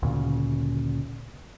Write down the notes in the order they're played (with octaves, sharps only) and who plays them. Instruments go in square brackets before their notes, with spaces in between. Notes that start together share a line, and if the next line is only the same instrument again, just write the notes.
[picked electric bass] D2 A#2 C#3